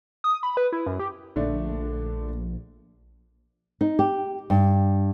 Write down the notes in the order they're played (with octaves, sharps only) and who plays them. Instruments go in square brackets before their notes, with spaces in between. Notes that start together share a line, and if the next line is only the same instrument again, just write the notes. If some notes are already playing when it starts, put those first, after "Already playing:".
[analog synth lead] D#6
B5
B4
E4
F#2
G4
[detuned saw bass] A#1 [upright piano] D3 A3 D4
[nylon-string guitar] D#4
G4
G2